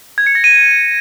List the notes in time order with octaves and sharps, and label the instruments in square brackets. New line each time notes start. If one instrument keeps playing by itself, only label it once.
[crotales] G#6
C#7
A#6
D#7